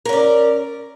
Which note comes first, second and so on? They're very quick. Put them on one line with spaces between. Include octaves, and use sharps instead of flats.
A#4 C#4 D5